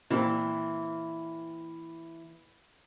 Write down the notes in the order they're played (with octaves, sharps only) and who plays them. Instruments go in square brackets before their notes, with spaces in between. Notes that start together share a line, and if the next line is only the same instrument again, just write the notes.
[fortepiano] A#2 A#3 C4 [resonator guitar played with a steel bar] E3